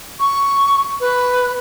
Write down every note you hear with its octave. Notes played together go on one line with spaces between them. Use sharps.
C#6
B4